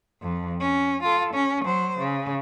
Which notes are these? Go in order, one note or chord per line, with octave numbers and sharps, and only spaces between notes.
F2
C#4
F4 A4
C#4
F#3 C5
C#3